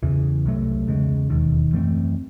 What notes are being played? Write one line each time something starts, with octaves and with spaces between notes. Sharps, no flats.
E2 C#3 E3
C2 C3 F#3 A3
E2 C#3 G#3
E1 D#2 D#3
F#2 E3 A3 C4